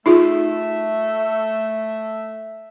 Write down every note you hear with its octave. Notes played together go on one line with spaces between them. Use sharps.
A3 D#4 F4 G#4 E5